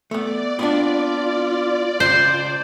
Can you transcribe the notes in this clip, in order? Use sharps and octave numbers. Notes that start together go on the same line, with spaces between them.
A3 B3 D5
B3 C4 D4 F4
C#2 C5